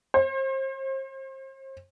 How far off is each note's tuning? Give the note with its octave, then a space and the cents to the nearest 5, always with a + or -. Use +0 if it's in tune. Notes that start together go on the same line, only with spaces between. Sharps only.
C5 +35